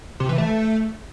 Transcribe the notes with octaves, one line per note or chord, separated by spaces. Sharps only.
C3
E3
A3